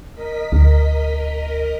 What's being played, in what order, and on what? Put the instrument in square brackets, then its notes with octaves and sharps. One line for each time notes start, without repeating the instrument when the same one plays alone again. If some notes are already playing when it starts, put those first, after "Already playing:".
[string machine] A#4 D#5 B6
[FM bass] D2